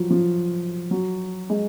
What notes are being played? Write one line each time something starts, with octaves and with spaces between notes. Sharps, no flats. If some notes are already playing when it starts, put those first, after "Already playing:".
Already playing: F3 F#3
F3
F#3
G#3